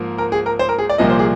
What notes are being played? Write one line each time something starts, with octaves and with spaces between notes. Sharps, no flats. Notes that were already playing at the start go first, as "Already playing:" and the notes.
Already playing: G#2 F3 A#3
A#4
G#4
A#4
C5
A#4
G#4
D5
C2 A#2 F3 A#3 D#5
C5
G#4